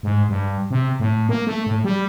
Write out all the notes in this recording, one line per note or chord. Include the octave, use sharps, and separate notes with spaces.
G#2
G2
C3
A2
A#3
A3
A2
G3